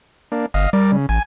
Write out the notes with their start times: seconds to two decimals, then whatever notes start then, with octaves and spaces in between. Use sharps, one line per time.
0.32 A#3 D4
0.54 G1 D#5 F5
0.73 G3 A#4 D5
0.92 C#3
1.09 A1 G#5